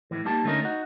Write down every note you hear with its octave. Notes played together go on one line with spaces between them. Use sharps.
A2 E3
G3 A#3 D#4 G4 A5
D3 A3 C#4 D#4 A#4
D#4 F#4